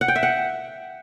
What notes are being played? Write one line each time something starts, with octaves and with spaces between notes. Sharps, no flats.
F#5
G5
E5
F#5